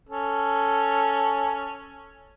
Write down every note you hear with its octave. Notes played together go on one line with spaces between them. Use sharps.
C#4 A4